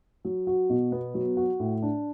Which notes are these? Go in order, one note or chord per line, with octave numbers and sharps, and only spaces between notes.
F#3
F#4
B2
B3
F#3
F#4
A2
D4